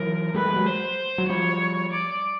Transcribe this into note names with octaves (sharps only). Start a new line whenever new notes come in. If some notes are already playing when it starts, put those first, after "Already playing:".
Already playing: E3 F#3 A#4
G3 A3 B4
G3 A3
F#3 G#3
C5
F#3
F3 G3 C#5
D5